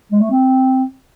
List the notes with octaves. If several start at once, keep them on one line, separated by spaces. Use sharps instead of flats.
G#3
A3
C4